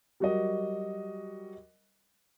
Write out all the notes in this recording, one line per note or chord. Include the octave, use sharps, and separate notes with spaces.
F#3 G3 F#4 A#4 D#5